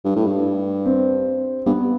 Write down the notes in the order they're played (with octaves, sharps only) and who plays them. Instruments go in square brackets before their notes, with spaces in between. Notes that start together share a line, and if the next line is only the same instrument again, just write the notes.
[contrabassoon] G2
A2
G2
[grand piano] C4
[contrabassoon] G2 [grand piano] B3